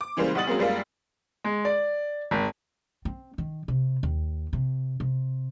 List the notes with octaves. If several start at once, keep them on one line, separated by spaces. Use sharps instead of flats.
D6
C#3 E3 G3 G#3 A#3 C5
B1 G3 F#5 D#6 A6 F#7
F#3 G#3 A#3 C4 C#4 G#4
F#2 G3 G#3 A#3 F4
G#3
D5
G#1
C4
D#3
C3
D#2
C3
C3